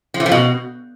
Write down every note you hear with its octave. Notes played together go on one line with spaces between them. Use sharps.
F3
E3
F3
B2